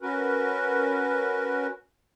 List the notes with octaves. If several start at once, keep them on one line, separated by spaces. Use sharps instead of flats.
C#4 F#4 A#4 B4